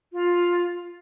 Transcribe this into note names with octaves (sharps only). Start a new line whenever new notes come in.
F4